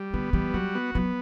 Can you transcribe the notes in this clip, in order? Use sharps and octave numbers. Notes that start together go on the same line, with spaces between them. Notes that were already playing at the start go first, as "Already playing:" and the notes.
Already playing: G3
D3 B3
E3 G3
F#3 F#4
B3
F#3 B3